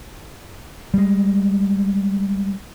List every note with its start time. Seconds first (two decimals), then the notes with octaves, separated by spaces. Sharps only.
0.94 G3 G#3